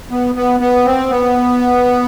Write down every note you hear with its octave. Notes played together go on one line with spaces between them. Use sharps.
B3
B3
B3
C4
B3